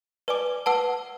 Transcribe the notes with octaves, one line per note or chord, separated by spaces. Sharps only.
B4 D5 G#5 D6
B4 F#5 A5 E6